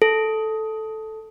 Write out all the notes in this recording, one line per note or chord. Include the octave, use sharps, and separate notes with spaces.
A4